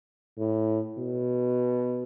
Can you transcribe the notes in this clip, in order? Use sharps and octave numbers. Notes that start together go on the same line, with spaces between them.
A2
B2